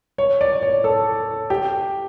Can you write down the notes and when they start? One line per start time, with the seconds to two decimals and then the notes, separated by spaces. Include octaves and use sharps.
0.18 C#5
0.41 D5
0.63 C#5
0.84 A4
1.50 G4